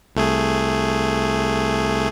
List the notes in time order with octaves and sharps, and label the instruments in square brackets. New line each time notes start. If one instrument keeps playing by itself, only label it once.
[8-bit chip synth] C2 A3 G#4